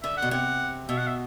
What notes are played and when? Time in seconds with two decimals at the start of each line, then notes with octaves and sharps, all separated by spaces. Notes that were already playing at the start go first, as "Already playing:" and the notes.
0.03 D3 E5
0.18 F#5
0.22 B2
0.31 C3 F#5
0.89 B2 E5
0.98 F#5
1.07 E5